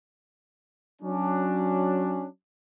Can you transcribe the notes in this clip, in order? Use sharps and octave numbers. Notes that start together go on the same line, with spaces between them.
F#3 C#4 D4